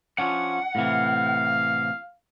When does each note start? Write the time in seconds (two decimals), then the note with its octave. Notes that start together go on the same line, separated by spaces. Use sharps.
0.19 F3 C#4 D4 F#5
0.75 A2 C3 E3 F5